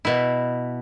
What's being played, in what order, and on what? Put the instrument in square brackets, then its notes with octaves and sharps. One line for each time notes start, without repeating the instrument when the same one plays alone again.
[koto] B2 E4